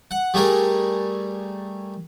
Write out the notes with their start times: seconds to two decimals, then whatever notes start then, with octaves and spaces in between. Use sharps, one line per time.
0.11 F#5
0.34 G3 A3 G#4 A#4